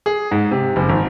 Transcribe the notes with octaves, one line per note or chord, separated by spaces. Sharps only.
G#4
G#2
C3
F#1
G#1